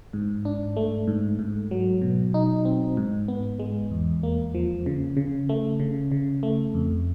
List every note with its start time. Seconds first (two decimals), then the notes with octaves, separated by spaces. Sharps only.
0.13 G#2
0.45 D4
0.76 A3
1.08 G#2
1.39 G#2
1.71 F#3
2.02 B2
2.34 D#4
2.65 C4
2.97 G#2
3.28 B3
3.59 G#3
3.91 E2
4.23 A#3
4.55 F3
4.86 C#3
5.17 C#3
5.49 A3
5.80 C#3
6.12 C#3
6.43 A3
6.74 F2